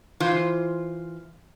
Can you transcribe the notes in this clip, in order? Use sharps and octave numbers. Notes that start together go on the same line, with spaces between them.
E3 F4 C5